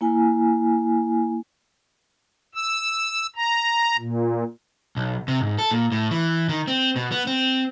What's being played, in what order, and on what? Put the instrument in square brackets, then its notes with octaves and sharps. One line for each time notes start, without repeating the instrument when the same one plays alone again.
[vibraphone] A#3 E4 G#5
[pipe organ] E6
A#5
A#2
[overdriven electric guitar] B1
C3
G#2
A4
A#2
A2
E3
D#3
C4
B2
B3
C4